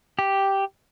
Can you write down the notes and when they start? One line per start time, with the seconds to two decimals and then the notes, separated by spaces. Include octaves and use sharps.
0.19 G4